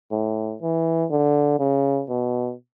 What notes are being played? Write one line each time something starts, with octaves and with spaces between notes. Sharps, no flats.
A2
E3
D3
C#3
B2